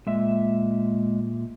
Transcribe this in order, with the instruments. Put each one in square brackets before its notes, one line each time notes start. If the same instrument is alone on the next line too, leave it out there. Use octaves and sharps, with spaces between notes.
[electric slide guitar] A#2 E5 [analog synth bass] G#3